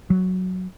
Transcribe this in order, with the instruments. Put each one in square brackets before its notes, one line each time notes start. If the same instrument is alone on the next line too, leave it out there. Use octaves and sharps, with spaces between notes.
[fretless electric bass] F#3